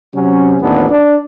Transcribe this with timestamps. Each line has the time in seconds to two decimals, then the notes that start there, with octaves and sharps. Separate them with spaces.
0.14 C3 F#3 C#4
0.60 A1 D#2 F3 B3 D4
0.89 D4